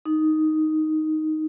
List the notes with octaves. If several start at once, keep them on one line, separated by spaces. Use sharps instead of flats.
D#4